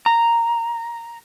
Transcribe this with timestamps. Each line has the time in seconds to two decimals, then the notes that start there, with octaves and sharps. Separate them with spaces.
0.06 A#5